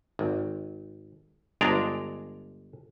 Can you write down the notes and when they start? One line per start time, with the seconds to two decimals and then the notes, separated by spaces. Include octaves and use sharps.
0.19 G#1
1.61 G1 G#3 D4 D5 A#5